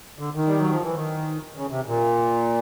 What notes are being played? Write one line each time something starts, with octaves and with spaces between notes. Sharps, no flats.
D3
D#3
G3
F#3
F3
E3
D#3
C#3
C3
A#2